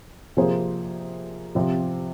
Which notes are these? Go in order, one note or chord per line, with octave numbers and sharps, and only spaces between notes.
C3 F3 A#3 G#4 C5
C3 F3 C4